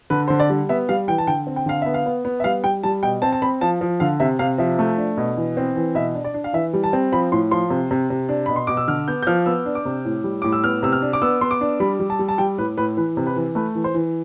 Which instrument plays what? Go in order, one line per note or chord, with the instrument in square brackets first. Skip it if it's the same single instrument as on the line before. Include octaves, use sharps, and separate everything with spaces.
[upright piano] D3 B4
D3 C5
D5
G3
B3 E5
G3 F5
E3 G5
A5
D3 G5
C4
G5
D3 F5
B3 E5
F5
B3
B3
E5
G3 F5
G3 G5
G3 A5
B2 G5
C4 A5
A5
C4 B5
F3 A5
F3
D3 F5
C3 E5
C3 F5
F3 E5
A3
D4
B2
E3
C4
E3
B2 E5
D4
D5
D4
F5
E3 E5
G3
A5
C4
F3 B5
A2 C6
F3 C6
C3
C3
C3
D4
B2 B5
C6
B2 D6
E6
D3 F6
B3 G6
G6
F3 F6
B3 E6
D4
D6
C3
A2
G3
A2 D6
E6
B3 F6
C3 E6
F6
D4
D6
B3 E6
B3 C6
D6
D4
G3 B5
G3
A5
G3
A5
G3 G5
A2 B4
A2 B4
E3 B4
C3
B4
E3
A3 B4
E3
C5
E3